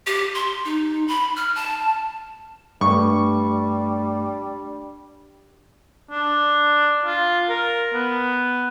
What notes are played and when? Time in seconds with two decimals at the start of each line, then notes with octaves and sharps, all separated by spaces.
0.07 G4
0.35 C6
0.65 D#4
1.08 B5
1.36 F6
1.56 A5
2.81 G2 G3 A3 D4 C#6
6.11 D4
7.05 F4
7.49 A#4
7.94 B3